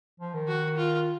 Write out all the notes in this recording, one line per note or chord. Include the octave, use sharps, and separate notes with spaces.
F3
D#3
F#4
F4